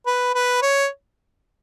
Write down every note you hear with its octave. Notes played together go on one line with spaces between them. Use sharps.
B4
B4
C#5